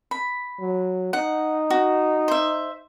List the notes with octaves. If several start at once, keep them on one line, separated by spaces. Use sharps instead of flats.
B5
F#3
D#4 F#5
F#4
C5 E5